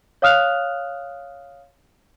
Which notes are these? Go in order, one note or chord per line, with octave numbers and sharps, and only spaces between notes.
C#5 F5 D#6 F6 F#6 F7